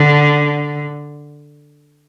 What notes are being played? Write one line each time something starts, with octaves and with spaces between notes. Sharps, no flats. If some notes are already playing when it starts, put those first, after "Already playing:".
Already playing: D3